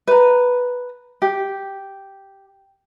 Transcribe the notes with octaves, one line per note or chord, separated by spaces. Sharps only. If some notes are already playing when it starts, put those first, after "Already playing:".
B4 A#5
G4